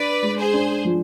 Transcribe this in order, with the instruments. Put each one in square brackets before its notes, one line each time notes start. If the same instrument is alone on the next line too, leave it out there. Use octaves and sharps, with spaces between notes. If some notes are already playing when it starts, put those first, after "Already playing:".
Already playing: [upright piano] D4 [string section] B4 D5
[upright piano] G#3
[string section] G#4 C5
[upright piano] D4
F3